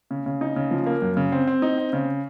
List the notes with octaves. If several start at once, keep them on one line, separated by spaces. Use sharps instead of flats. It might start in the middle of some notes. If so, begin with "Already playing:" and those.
C#3
C#3
D#4
C#3
F3
A#3
F#2
C#3
C4
C4
D#4
C4
C#3